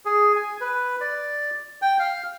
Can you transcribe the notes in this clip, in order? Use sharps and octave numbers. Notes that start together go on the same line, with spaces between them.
G#4
G#5
B4
D5
G5
F5